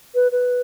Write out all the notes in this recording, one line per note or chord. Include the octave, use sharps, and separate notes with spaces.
B4
B4